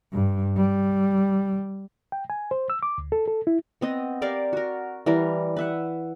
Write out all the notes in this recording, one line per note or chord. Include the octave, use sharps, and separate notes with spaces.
G2
G3
G5
G#5
C5
E6
D6
D2
A4
A4
E4
B3 C4 D#5
G4 A#4 D5 F5
F#4 A#4
E3 G3 A#4
B4 E5 F#5